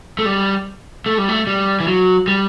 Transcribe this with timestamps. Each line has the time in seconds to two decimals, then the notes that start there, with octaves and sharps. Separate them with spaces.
0.19 A3
0.26 G3
1.06 A3
1.18 G3
1.29 A3
1.47 G3
1.80 E3
1.87 F#3
2.28 G3